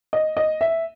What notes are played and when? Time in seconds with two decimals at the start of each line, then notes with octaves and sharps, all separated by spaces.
0.13 D#5
0.37 D#5
0.61 E5